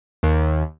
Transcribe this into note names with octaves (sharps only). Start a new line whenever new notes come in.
D#2